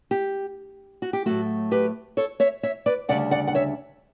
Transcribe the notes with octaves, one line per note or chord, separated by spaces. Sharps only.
G4
F#4
G4
A2 F#3 A3 F#4 A4
G4 B4
A4 C#5
C#5 E5
C#5 E5
B4 D5
D2 C#3 G3 D4 D5 F#5
D5 F#5
F#5
C#5 E5